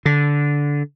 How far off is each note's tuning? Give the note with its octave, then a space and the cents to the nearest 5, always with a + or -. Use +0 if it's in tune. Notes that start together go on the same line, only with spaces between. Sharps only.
D3 -15